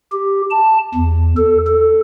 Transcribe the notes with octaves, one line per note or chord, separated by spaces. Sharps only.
G4
A5
E2
A4
A4